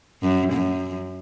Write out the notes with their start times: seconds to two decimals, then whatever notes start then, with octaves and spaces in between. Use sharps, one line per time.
0.23 F#2
0.53 F#2